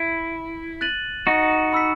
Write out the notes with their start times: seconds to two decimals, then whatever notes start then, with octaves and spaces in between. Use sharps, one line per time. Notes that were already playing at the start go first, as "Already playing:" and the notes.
Already playing: E4
0.81 F#6 A6 D#7 F#7
1.27 D#4 F#4
1.73 B5 E6 B6